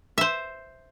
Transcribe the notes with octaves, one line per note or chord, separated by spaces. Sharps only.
C5 E5